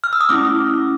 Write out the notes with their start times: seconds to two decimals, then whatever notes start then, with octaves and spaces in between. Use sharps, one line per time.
0.04 F6
0.13 E6
0.21 D#6
0.29 A3 C#4 E4 D6